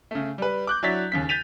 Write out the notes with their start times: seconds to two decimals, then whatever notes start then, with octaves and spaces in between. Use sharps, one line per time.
0.11 C#3 A3
0.38 G3 B4
0.67 D6 F#6 G6
0.83 F#3 D4 E4 C#5 A6 B6
1.12 D#2 C#3 B6
1.29 G6 A6 B6 D#7 F7